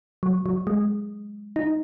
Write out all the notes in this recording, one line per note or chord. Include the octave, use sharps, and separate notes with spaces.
F#3
F#3
G#3
D#4